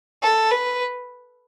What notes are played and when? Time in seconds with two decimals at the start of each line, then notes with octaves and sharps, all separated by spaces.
0.22 A4
0.51 B4